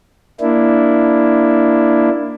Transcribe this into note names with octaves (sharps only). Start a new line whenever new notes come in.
A#3 D4 E4